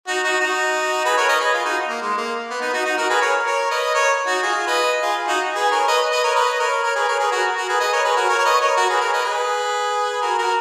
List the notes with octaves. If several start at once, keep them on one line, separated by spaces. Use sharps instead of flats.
D#4 F#4
D#4 F#4
D#4 F#4
G#4 B4
A#4 C#5
B4 D#5
G#4 B4
F4 G#4
D#4 F#4
A#3
G#3
A#3
B3
B3 D#4
D#4 F#4
D#4 F#4
F#4 A#4
G#4 B4
A#4 C#5
A#4 C#5
B4 D#5
A#4 C#5
D#4 F#4
F4 G#4
B4 D#5
F4 G#4
D#4 F#4
G#4 B4
A#4 C#5
B4 D#5
B4 D#5
A#4 C#5
B4 D#5
D#5
A#4 C#5
A#4 C#5
G#4 B4
A#4 C#5
G#4 B4
F#4 A#4
F#4 A#4
G#4 B4
B4 D#5
A#4 C#5
G#4 B4
F#4 A#4
A#4 C#5
C#5
B4 D#5
A#4 C#5
F#4 A#4
G#4 B4
A#4 C#5
B4 D#5
G#4 B4
F#4 A#4
F#4 A#4